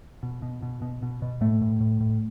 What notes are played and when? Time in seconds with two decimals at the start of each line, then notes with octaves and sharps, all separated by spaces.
0.23 B2
0.42 B2
0.62 B2
0.82 B2
1.03 B2
1.22 B2
1.41 A2 A3
1.61 A2
1.80 A2
2.00 A2